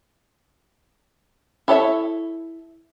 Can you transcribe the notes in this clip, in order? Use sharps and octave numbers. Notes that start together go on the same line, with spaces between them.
E4 A4 C#5 D5 E5